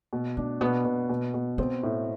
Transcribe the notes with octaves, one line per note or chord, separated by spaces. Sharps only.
B2
A3 D4
B2 B3
B2
B2
B2
B3 C4
A2